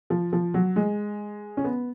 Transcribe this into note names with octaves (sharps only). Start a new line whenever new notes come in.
F3
F3
F#3
G#3
C#4
B3